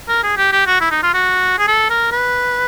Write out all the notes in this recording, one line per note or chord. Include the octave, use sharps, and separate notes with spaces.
A#4
G#4
G4
G4
F#4
E4
D#4
F4
F#4
G#4
A4
A#4
B4